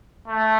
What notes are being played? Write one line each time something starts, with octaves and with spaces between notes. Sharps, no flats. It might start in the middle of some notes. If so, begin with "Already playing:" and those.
A3